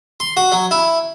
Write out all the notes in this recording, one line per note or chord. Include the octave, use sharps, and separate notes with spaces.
C6
F#4
F#3
E4